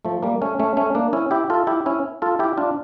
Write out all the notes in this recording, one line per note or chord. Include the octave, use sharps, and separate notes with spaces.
F3 A3
G3 A#3
A3 C#4
A3 C#4
A3 C#4
A#3 D4
C#4 E4
E4 G4
F4 A4
E4 G4
C#4 E4
F4 A4
E4 G4
D4 F4